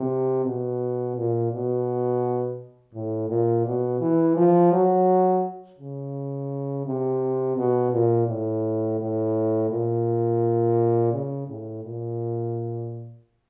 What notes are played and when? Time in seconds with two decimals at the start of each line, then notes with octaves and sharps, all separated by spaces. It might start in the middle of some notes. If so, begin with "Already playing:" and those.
Already playing: C3
0.45 B2
1.16 A#2
1.52 B2
2.94 A2
3.29 A#2
3.65 B2
4.01 E3
4.37 F3
4.72 F#3
5.79 C#3
6.86 C3
7.57 B2
7.92 A#2
8.28 A2
8.99 A2
9.70 A#2
11.13 C#3
11.48 A2
11.83 A#2